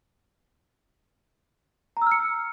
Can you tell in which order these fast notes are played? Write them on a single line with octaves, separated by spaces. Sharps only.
A#5 E6 F6 C#7